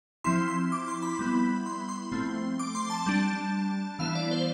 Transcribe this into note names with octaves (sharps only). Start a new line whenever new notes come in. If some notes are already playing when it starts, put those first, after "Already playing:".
F3 C4 E4 C6
C6
D6
C6
B5
G3 B3 E4
C6
C6
F3 A3 C4
D6
C6
A5
G3 D4
E3 B3 E4 F5
D5
C5